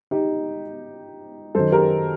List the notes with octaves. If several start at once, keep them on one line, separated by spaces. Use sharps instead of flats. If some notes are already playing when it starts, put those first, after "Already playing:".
D#4 G4
F#2 D#3 A4 C5
G4 A#4